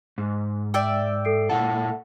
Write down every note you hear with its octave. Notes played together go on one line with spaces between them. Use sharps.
G#2
D5 E5 G5
A4 C7 D7
A#2 E4 A4 F#5